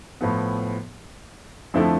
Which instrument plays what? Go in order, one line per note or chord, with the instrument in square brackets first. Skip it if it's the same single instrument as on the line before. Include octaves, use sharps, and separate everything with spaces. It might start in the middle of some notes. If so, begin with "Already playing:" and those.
[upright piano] A2 F3 B3
F2 D3 F3 A3 E4